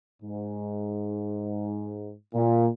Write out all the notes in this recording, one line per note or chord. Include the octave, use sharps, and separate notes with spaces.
G#2
A#2